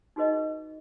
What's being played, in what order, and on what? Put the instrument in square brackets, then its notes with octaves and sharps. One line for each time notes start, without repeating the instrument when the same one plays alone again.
[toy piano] D#4 F#4 G#4 B4 D#5